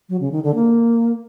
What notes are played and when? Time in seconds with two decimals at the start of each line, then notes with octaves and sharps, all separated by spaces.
0.09 F#3
0.20 C#3
0.32 D#3
0.43 D3
0.55 A#3